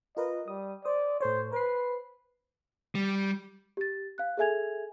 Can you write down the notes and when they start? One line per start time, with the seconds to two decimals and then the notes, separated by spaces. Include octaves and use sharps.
0.17 F4 A#4 B4 D#5
0.48 G3 D#6
0.85 C5 D5 D#6
1.21 A2 A4 C5 C#5
1.52 B4 C5 C7
2.95 G3
3.77 G4 A6
4.18 F5 F#6
4.37 G#4 A4 E5 G#5 G#6 F7